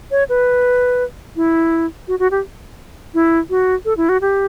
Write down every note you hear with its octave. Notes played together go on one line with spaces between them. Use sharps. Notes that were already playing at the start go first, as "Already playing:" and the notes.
C#5
B4
E4
F#4
F#4
G4
E4
F#4
A4
E4
F#4
G4